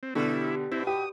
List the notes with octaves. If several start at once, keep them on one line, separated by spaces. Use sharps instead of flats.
C4
B2 D3 G3 E4
B2 C4 E4
G4 D#6